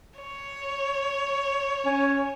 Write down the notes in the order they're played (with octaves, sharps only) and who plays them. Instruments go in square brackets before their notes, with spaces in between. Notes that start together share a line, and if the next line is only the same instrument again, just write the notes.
[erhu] C#5
[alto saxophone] C#4